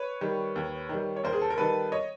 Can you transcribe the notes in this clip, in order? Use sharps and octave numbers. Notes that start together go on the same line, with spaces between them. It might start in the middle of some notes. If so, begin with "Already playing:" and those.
Already playing: B4 C#5
D#3 G3
D#2
D#3 G3
C#5
D#2 A#4 C5
G#4
A4
A#4
D#3 G3 A4 B4
C#5 D#5